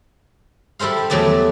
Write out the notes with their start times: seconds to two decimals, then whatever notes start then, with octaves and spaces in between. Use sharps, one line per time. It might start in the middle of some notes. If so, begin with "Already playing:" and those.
0.79 G3 E4 A4 C5 F5
1.10 E2 F#3 A3 D5 A5